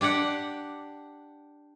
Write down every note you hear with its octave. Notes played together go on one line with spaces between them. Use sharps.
D4 G4 D5 F#5